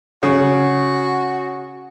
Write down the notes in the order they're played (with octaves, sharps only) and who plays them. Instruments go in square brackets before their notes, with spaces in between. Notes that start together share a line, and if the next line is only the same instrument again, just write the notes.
[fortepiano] C#3 [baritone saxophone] F#4